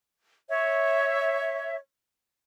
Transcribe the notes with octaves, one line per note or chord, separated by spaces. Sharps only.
C#5 E5